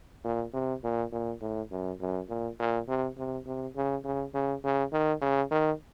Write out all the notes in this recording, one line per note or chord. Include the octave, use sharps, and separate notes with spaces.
A#2
C3
A#2
A#2
A2
F#2
F#2
A#2
A#2
C3
C3
C3
C#3
C#3
C#3
C#3
D#3
C#3
D#3